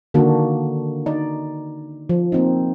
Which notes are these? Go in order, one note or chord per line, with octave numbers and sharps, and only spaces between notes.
D3 D#3 A#3 D4 F#4
D#4 D5
F3
A#3 C4 D#4